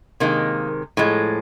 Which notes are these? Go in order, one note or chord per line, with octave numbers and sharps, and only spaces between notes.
C3 D#3 G#3 A#3
A2 F3 G#3